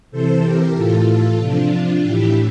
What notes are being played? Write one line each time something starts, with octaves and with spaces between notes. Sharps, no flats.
C3 E3 A4 C5
G4 A#4
A2 E3 F4 A4
F4 A4
C3 F3 D4 F4
A2 E3 E4 G4